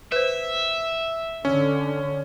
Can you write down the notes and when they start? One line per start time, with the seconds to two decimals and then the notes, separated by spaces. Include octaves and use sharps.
0.12 B4 C5 E5
1.45 D3 C#4